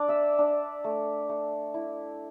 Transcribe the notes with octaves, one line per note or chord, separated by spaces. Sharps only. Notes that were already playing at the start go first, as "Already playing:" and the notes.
Already playing: D4 D5 D6
E5 E6
D4
A3
A3
E4